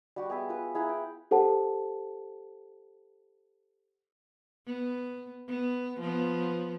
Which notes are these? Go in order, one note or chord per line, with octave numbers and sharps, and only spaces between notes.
G3 F#4 G4
B3 G#4 E5
F4 B4
E4 G#4 F#5 A#5
G5
G4 A4 C5 F#5 A5
B3
B3
F3 B3